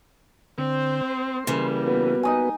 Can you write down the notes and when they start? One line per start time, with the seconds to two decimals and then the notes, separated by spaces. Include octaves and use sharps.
0.58 D3 C4 C5
1.08 C6
1.47 C#3 E3 G3 A#3
1.87 B3 F#4 B4
2.23 D#4 D#5 G#5